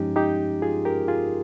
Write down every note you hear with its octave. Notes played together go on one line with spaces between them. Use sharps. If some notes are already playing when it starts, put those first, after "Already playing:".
Already playing: G2 F3 G#3 C#4 D#4 G4
D#4 G4
F4 G#4
G4 A#4
F4 G#4